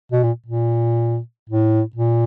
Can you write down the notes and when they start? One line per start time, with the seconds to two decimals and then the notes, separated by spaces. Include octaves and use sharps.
0.12 B2
0.23 A#2
0.46 A#2
1.49 A2
1.96 A#2